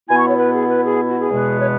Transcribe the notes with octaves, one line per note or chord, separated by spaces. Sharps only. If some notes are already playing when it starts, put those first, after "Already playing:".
B2 B3 E4 G#5
C#6
C#5
B4
G#4
B4
G#4
F#4
G#4
E2 B2 G#3 B3
C#5